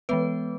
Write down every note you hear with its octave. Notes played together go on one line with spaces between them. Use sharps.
E3 G#3 B3 B4